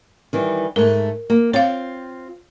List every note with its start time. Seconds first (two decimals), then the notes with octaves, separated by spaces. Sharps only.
0.33 D#3 E3 G3
0.76 G#2 A3 A#4
1.30 A#3
1.53 C4 F4 C#5 F5 G5